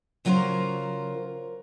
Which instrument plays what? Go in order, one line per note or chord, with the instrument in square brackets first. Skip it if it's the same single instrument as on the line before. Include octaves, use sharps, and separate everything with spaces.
[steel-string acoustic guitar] C#3 F#3 F4 A4 A#4 C5